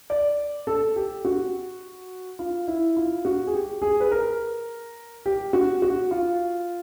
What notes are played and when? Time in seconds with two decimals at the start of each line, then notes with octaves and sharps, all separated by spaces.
0.10 D5
0.67 A4
0.96 G4
1.25 F#4
2.39 F4
2.68 E4
2.96 F4
3.25 F#4
3.47 G#4
3.53 G4
3.82 G#4
4.00 B4
4.11 A#4
5.26 G4
5.53 F#4
5.82 F#4
6.11 F4